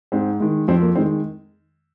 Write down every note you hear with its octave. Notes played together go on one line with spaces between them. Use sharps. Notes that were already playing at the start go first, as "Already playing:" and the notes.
G#2 C4
D#3 G#3
F2 C4
A#3
D#3 G#3 C4